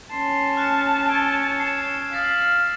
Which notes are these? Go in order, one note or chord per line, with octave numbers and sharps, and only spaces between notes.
C#4 A5 C6
F6 F#6 C#7
C#5 E6 D7
C7 E7
F5 D#6 A6 B6